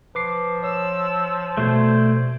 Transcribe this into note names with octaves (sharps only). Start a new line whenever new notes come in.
F3 B4 D6 C7
C#5 E6
B2 A3 F#4 C5 D5 G#6